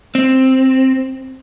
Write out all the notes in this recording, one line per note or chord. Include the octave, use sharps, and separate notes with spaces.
C4